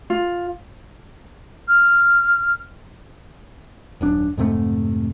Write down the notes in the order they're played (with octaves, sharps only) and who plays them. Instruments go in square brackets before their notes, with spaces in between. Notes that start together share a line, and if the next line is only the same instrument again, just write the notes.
[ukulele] F4
[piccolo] F6
[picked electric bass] D#1 F#2 D4
F2 G#2 C3 A3